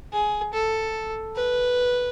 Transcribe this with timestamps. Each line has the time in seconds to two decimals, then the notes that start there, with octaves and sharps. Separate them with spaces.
0.13 G#4
0.53 A4
1.36 B4